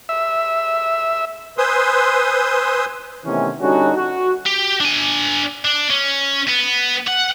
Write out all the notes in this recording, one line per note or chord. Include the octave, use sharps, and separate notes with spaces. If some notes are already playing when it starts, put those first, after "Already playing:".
E5
B4 C5 G#5 C6 D#6 E6
C3 D#3 E3 A3 B3 C#4
D3 G3 C#4 D#4 F#4
F#4
G4
D4 G#5
D4
C#4
B3
F#5